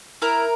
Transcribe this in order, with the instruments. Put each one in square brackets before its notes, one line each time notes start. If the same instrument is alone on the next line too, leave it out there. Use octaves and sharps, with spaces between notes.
[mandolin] E4 A#4